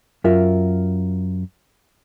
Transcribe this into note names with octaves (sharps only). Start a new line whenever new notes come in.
F#2 F4 A#4 E5